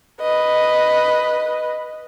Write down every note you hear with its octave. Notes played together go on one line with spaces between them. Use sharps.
B4 D#5